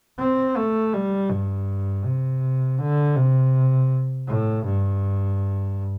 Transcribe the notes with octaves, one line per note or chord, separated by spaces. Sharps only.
C4
A3
G3
G2
C3
D3
C3
A2
G2